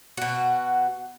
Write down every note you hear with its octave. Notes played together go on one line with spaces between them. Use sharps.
B2 F#4